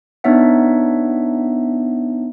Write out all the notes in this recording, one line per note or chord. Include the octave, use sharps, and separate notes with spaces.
B3 D4 D#4 C#5 E5 F#5